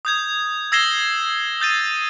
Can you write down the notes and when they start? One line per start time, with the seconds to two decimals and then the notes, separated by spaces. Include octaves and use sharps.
0.05 D#6 G6 G#6
0.72 E6 G#6 A#6 C7 E7 G7
1.60 D#6 G6 A6 D#7